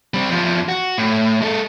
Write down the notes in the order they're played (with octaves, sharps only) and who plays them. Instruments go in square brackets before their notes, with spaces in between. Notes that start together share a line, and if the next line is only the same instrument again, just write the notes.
[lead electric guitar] G3 C4
E2 F3
F#4
A2
G#3 A4